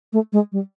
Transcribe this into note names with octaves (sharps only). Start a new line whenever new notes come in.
A3
G#3
G3